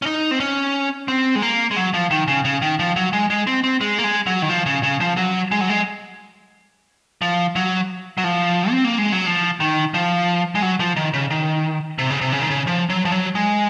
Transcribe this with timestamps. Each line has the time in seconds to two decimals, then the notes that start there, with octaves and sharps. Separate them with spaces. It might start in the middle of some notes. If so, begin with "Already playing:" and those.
0.02 C#4
0.06 D#4
0.31 C4
0.40 C#4
1.08 C4
1.35 G#3
1.42 A#3
1.71 G#3
1.77 F#3
1.94 F3
2.11 D#3
2.28 C#3
2.45 C#3
2.62 D#3
2.79 F3
2.96 F#3
3.13 G#3
3.30 G#3
3.47 C4
3.64 C4
3.81 G#3
3.99 A#3
4.04 G#3
4.26 F#3
4.42 D#3
4.50 F3
4.66 C#3
4.83 C#3
5.00 F3
5.17 F#3
5.51 G#3
5.61 F#3
5.70 G#3
7.22 F3
7.56 F#3
8.18 F#3
8.24 F3
8.71 C4
8.84 A#3
8.98 G#3
9.12 F#3
9.26 F3
9.60 D#3
9.94 F3
10.55 G#3
10.62 F#3
10.80 F3
10.96 D#3
11.14 C#3
11.31 D#3
11.99 C3
12.10 C#3
12.21 C3
12.32 C#3
12.41 D#3
12.50 C#3
12.67 F3
12.90 F#3
13.05 F3
13.12 F#3
13.35 G#3